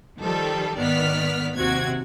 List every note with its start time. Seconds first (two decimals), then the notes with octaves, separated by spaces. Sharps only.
0.19 D#3 F3 G3 A4
0.76 G#1 D#3 B3 D5 F6 B6
1.55 D#2 C3 F#4 G#6